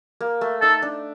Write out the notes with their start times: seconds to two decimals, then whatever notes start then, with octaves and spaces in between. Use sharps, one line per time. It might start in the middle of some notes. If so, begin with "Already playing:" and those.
0.21 A#3
0.41 A3
0.61 D#4 A4
0.82 D4